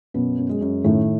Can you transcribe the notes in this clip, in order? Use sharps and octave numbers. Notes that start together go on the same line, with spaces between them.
F#2 B2 B3
F#2
G#3
F#2
A2 D#3 A3